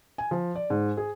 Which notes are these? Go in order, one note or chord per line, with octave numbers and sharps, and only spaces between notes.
G#5
F3
D5
G#2
G#4